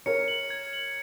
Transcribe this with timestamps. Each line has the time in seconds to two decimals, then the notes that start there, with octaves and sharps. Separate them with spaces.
0.06 A#4 C#5 C#7
0.28 F#7
0.50 G#6
0.73 F#7